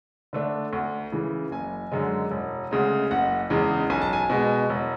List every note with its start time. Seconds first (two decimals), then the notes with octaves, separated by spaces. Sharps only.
0.33 D3 A3 D4
0.73 D2
1.12 C#3 E3
1.51 F#1 G#5
1.92 F#2 D3 G#3
2.31 E1
2.71 D2 C#3 G#3
3.11 F#1 F#5
3.50 E2 C#3 G#3
3.90 B1 G#5
4.02 A5
4.13 G#5
4.30 B2 G#3
4.70 E1